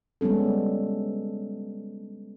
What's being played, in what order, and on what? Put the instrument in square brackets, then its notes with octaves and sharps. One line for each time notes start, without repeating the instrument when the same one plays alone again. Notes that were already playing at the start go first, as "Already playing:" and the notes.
[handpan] G3 G#3 B3 C#4 A4